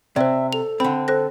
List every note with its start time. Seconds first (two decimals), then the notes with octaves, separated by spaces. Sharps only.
0.16 C3 C5 D5 E5
0.53 A4 F7
0.80 D3 C4 B5
1.08 A4 C5 F#6 A#6